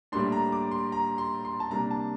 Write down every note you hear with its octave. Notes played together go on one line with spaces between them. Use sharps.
A2 G3 A#3 D4 C6
A#5
D6
C6
A#5
C6
C6
A5
C3 G3 A#3 D4 A#5
A5